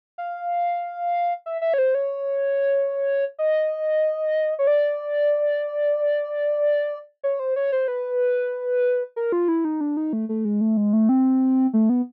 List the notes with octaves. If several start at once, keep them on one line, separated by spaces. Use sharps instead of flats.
F5
E5
E5
C#5
C5
C#5
D#5
C#5
D5
C#5
C5
C#5
C5
B4
A#4
F4
E4
D#4
D4
D#4
A3
A3
G#3
A3
G#3
A3
C4
A3
B3